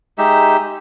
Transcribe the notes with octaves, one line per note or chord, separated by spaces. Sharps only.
G#3 D#4 G4 E5